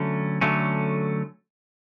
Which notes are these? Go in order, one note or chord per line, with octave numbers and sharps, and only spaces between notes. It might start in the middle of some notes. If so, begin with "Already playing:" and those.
Already playing: D3 F#3 A3 C#4
D3 F#3 A3 C#4